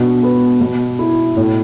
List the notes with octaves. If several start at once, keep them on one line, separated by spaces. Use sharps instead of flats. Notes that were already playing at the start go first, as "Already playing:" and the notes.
Already playing: B2 D4
B3
B2
E4
A2